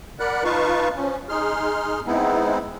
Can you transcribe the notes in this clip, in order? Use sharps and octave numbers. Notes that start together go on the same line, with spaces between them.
A#4 D5 F#5 B5 F#6
D#4 F4 B4 F5 A5 C#6
F3 C#4
D#4 G#4 C6 F6
G#3 B3 C4 D#4 E4